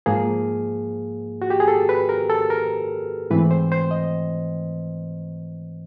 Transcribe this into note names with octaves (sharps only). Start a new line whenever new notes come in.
G#2 F3 A#3 G#4
F#4
G4
G#4
A4
B4
A#4
A4
A#4
G#2 E3 A3 C4 B4
C5
C5
D#5